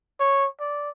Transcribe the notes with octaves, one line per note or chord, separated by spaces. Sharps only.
C#5
D5